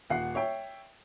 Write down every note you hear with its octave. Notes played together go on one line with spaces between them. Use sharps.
D#1 F#5 C7
C#5 E5 G5